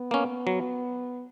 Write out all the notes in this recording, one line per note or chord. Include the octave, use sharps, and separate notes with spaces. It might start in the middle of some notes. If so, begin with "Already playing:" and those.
Already playing: B3
A#3 C#4
F#3